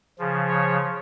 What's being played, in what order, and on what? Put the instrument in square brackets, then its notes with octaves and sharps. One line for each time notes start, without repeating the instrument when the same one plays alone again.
[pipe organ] C#3 F3
C#5